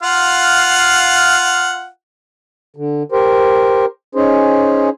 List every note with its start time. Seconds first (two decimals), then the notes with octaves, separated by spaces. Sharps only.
0.03 F4 F5 F#5
2.76 D3
3.12 G4 A#4 C5
4.15 C#4 D#4 G#4 C5